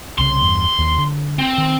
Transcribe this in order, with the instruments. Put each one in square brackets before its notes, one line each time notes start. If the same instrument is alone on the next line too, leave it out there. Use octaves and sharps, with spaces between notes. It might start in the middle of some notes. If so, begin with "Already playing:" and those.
[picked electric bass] C2 C#3 [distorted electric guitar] C6
[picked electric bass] E2 G2
D#2
D3
[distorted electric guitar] C4
[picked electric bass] D#3